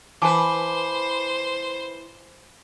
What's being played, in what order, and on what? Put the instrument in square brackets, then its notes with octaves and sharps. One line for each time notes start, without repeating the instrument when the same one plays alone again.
[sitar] E3 B4 [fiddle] C5 [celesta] G#5 A5 D6